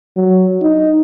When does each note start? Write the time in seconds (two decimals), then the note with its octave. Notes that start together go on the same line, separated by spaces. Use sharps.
0.17 F#3
0.61 D#4